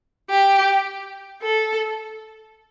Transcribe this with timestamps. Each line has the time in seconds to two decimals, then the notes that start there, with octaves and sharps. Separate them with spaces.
0.30 G4
1.42 A4